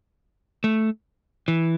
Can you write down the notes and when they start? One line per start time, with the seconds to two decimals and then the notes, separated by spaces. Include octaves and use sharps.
0.64 A3
1.48 E3